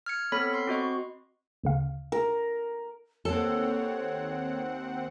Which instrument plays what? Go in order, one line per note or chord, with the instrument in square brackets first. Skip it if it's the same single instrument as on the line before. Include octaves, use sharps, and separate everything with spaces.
[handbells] F6 G#6 C#7
B3 C4 A4 C#5 B5 B6
B5 C6 C7
C4 F#4 D#5 C#6
[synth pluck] D2 C#3 F5
[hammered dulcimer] A#4
[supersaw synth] D#2 C4 F#5 [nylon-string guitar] A#3 A4 [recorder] C#5